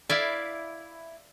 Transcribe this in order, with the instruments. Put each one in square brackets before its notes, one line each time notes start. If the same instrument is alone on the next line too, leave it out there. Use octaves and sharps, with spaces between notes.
[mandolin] E4 [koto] D5 E5 F5